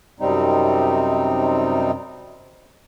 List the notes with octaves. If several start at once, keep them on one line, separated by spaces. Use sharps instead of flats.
F#2 C3 G3 C4 D#4